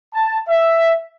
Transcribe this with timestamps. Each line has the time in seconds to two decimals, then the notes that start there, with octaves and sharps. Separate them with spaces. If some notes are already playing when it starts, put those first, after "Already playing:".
0.13 A5
0.48 E5